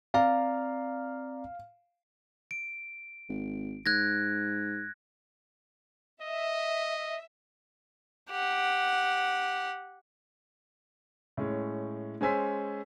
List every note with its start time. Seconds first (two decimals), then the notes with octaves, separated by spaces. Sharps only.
0.14 C4 D5 F5 A#5
2.51 D7
3.29 G#1
3.86 G#2 F#6 G#6 A#6
6.22 D#5 E5
8.31 G4 F#5
11.37 A2 G#3 C#4
12.21 G#3 C#4 C5 G#5 E6 B6